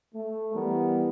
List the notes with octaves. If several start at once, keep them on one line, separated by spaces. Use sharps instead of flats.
A3
E3 G3 B3 A#4